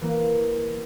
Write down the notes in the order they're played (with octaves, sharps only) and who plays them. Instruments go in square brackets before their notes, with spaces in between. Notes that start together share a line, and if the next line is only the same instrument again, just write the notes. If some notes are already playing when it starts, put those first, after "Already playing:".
[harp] E3 A#3